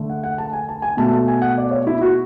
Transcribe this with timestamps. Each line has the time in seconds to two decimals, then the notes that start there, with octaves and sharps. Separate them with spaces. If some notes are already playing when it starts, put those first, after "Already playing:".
Already playing: D3 A3
0.10 F#5
0.24 F#5
0.38 A5
0.53 G#5
0.69 A5
0.82 G#5
0.97 B2 A3 A5
1.13 A5
1.28 G#5
1.42 F#5
1.58 D5
1.71 C#5
1.87 E4
2.01 F#4